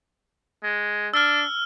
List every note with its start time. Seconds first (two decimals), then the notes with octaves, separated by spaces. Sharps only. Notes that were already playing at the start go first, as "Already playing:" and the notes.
0.64 G#3
1.14 D4 E6 F6